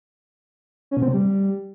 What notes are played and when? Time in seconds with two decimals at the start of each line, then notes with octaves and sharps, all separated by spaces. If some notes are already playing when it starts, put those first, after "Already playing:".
0.91 C#4
0.97 B2
1.03 C4
1.08 C3
1.14 G3